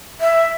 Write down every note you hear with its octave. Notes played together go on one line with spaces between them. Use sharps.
E5